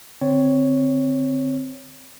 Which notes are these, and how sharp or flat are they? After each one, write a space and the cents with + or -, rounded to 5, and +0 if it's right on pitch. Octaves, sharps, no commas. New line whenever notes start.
D3 +0 C4 -5 C#5 +5